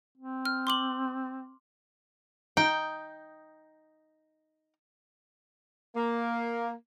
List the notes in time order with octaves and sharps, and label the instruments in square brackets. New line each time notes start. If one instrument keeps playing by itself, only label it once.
[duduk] C4
[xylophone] F6
C6 D6 F#7
[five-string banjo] D#4 [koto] G5
[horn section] A#3